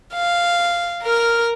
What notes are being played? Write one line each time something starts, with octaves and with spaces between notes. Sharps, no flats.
F5
A#4 F6